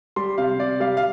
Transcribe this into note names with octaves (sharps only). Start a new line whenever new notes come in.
G3 C6
C3 F5
C3 D5
G3 F5
F5